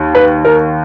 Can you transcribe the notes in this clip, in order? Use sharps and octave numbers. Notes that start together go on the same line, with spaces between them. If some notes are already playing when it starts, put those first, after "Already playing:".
Already playing: D#2 D#3
B4
A#4